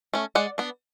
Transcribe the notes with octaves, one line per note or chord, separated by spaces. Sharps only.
A3 C#4
G#3 D5 F#5
B3 D4